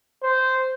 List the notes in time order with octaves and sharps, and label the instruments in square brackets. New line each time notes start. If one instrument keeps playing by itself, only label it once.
[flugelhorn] C5